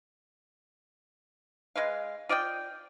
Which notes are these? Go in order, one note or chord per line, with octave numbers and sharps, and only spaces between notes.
G#3 B4 F5
F4 D5 D#5 G5